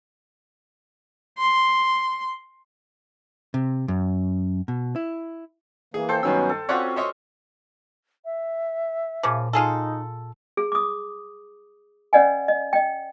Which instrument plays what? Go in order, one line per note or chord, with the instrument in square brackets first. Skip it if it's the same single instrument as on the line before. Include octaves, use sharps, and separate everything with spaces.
[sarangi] C6
[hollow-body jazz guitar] C3
F#2
B2
E4
[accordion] E3 A#3 [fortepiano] G#4
[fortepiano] A4 [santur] C5 G5
[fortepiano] G2 D#3 E6 [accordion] F#3 B3 C#4
[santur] A4
[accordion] C4 [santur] C#4 F4 F#4 [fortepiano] C#5 D5 F#5
[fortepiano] C5 C#5 D#5
[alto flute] E5
[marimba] A#2 D6 [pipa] C#3 F3
[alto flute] D#4 [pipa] F4 G#4 A4
[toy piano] G#4
D6 D#6
C#4 B4 D5 D#5 F#5 G#5
D#5
D#5 G5